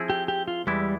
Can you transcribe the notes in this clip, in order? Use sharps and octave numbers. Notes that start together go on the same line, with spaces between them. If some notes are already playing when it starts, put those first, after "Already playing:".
Already playing: F3 C4 E4 G#4
G4
G4
F4
E2 E3 G3 G#3 E4